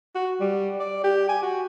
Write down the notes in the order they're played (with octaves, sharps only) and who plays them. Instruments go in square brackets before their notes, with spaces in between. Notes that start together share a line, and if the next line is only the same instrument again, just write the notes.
[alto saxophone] F#4
G3
D5
G4
G#5
F#4